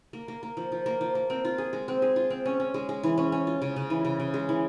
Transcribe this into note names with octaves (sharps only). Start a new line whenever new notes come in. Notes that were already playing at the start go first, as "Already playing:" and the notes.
A#3
A#3
A#3
F3
F3
A#3
F3
A#3
C4
F4
G#4
G#3
C4
G#4
F4
C4
C#4
C#4
G#3
G#3
E3
C#4
C#4
F4
C#3
C#3
E3
C#3
C#3
G#3
E3